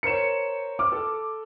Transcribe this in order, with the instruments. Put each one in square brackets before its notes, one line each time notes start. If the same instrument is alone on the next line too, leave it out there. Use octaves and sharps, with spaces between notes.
[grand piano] A#4 C5 C#5 [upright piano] C#7 E7
[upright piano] D6 [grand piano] F6
[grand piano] A4